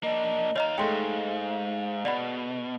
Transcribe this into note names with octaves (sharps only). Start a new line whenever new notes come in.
A#3 D4 D#5
D#3 C#5 D#5 F5 A#5
G#2 G#3 A3 F5 G5 C6
B2 D5 F#5 B5